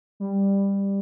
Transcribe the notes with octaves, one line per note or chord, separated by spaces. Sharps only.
G3